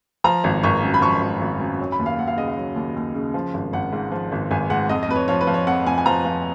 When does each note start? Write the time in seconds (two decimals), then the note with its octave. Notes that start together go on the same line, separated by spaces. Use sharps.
0.24 F3 A#5
0.44 G#1
0.63 G#1 C#6
0.83 F#2
0.94 B5
1.01 F3 C#6
1.21 G#1
1.41 G#1
1.60 F#2
1.79 F#3
1.92 B5
1.99 D#2
2.06 F5
2.18 D#2 F#5
2.28 F5
2.37 C#3 D#5
2.48 F5
2.57 F#3
2.76 D#2
2.96 D#2
3.15 C#3
3.34 F3
3.54 G#1
3.73 G#1 F#5
3.93 G#2
4.12 F3
4.32 G#1
4.51 G#1 G#5
4.70 G#2 F#5
4.89 F2 D#5
5.03 D#5
5.08 F2 B4
5.16 C#5
5.28 F3 C#5
5.41 B4
5.47 F3
5.54 C#5
5.67 F2 F#5
5.86 F2 G#5
5.98 G#5
6.06 F3 A#5
6.25 F3